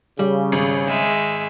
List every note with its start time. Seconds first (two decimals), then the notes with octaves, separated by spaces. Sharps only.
0.19 C#3 G3
0.52 G#1
0.87 G#3 E5